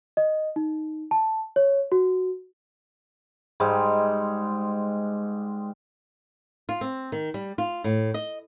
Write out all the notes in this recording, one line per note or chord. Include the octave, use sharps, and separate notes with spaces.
D#5
D#4
A5
C#5
F#4
G#2 G3 G#3
F4
C4
D#3
G3
F4
A2
D#5